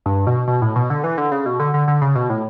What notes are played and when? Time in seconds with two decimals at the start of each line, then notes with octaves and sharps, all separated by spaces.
0.06 G2
0.27 B2
0.48 B2
0.62 A2
0.76 B2
0.90 D3
1.04 E3
1.18 D3
1.32 C#3
1.46 B2
1.60 D3
1.74 D3
1.88 D3
2.02 C#3
2.15 B2
2.30 A2